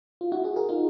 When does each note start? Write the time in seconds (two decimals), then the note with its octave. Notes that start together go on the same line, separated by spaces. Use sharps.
0.21 F4
0.32 E4 F#4
0.44 F#4 G#4
0.56 G#4 A#4
0.69 D#4 F4